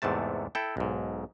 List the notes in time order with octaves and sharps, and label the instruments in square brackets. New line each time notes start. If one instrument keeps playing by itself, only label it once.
[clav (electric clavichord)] E2 G#2 C3 A3 A5
E4 A4 G5
B1 G#2